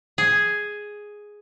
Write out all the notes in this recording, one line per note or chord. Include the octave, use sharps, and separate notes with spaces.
G#4